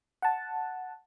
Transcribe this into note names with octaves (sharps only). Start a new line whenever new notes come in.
F#5 A5